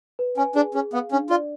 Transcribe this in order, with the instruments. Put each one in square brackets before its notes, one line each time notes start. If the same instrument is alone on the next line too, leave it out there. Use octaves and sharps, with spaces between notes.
[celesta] B4
[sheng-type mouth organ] C#4 [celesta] G#5
[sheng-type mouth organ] D4 [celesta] G#4
[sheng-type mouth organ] C#4 [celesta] G#4
[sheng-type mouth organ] B3 [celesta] F5
[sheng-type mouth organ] C#4 [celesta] D4
[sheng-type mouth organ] F4 [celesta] D5